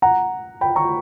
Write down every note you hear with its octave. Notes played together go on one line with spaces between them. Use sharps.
F#5 A#5
G5 B5
A#5 C#6